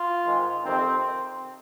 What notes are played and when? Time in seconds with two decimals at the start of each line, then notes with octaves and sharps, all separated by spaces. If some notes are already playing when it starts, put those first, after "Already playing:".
Already playing: F4
0.24 G#2 D#3 G#3
0.63 F2 C3 D#3 C4